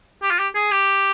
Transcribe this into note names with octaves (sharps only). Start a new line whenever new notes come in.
G4
F4
G4
G#4
G4